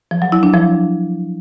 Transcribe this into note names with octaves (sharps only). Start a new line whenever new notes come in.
F3
F#3
E4
D4
F3